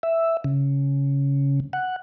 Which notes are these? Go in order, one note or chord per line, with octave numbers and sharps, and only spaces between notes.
E5
C#3
F#5